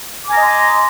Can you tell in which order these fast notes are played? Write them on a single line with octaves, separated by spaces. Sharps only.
D6 G#5 A#5 D#5 C6